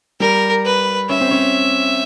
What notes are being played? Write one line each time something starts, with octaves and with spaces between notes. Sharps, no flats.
G3 A#4
B4
C#4 E5
C4
C#4